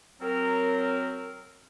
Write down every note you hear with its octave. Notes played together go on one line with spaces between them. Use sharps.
F#3 C4 A#4